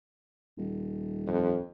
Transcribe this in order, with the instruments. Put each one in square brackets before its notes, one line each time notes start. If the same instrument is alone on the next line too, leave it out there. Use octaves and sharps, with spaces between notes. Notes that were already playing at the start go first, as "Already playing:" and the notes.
[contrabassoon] D#1
[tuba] F2